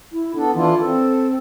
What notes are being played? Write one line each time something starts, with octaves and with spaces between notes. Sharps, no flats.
E4
B3 D4 A4
E3 D4 E4 F4
C4 A4